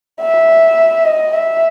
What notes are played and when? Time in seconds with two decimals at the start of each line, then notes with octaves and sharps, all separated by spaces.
0.22 E5
1.05 D#5
1.33 E5